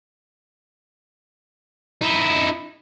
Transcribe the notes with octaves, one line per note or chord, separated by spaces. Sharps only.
D#4 E4